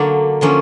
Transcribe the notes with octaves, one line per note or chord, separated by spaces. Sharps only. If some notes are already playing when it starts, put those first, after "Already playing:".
Already playing: D3 F#3 A#3 D5
D3 F3 A#3 C#4